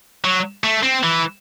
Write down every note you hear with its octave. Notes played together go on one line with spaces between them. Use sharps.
F#3
A3
C4
E3